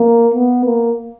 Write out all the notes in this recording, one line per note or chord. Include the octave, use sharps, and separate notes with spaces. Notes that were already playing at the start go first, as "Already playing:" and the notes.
Already playing: A#3
B3
A#3